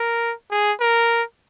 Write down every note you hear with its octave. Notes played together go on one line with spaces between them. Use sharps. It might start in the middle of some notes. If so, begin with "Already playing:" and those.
Already playing: A#4
G#4
A#4